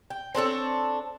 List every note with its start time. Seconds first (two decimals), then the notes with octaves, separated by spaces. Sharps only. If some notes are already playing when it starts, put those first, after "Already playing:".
0.10 G5
0.35 C4 D4 A4 C#5